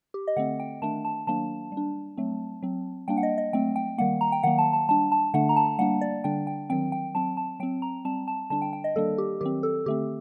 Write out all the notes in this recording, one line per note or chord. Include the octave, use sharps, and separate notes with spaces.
G4
D#5
D3 A3 C4 F#5
G5
D#3 A3 D4 A5
A5
D#3 F#3 A#3 D4 A5
G3
D4
F#3 A3 C4
F#3 C4
G3 A#3 D4 G5
F#5
D#5
D#5
F#3 A3 C4 G5
G5
D#3 G3 A#3 F#5
A#5
G5
D#3 F#3 A#3 F#5
A5
A5
G3 D4 A5
A5
D3 A3 D4 F#5
A#5
A5
G3 A#3 D4 F#5
D5
D3 G3 D4 G5
G5
D#3 F#3 C4 G5
G5
F#3 C4 A5
A5
F#3 C4 G5
A#5
G3 C4 A5
A5
D3 G3 D4 A5
G5
G5
D#5
D#3 G3 A#3 D4 A4
G4
D#3 F#3 C4 G4
A4
D3 A3 C4 G4